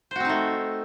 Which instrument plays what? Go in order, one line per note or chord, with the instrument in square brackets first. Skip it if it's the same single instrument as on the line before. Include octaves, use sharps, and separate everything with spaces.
[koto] C5
F#4
C4
D#4
A3